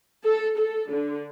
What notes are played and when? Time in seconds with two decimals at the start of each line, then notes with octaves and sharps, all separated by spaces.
0.23 A4
0.58 A4
0.90 D3